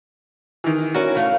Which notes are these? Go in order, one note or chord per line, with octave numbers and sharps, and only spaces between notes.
D#3 E3
C#4 E4 F#4 A#4
C#3 A3 F5